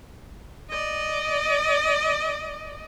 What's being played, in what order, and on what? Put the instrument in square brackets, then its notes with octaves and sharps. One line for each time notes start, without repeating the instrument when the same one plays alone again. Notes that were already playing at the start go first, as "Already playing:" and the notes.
[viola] D5 D#5